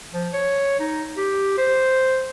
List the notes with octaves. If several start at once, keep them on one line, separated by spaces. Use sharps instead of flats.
F3
C#5
D#4
G4
C5